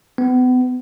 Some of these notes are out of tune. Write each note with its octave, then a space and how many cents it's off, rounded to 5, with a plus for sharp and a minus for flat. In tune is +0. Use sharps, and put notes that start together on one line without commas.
B3 +35